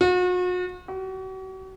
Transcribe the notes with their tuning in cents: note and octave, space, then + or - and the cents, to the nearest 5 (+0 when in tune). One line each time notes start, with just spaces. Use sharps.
F#4 -40
F#4 +40